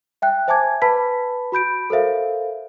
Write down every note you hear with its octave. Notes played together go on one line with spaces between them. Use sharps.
E5 G5 F#6
C5 E5 G#5 A5 D6 G#6
B4 A5 B5 B6
F#4 B5 G6 D7
A4 A#4 C5 E5 F5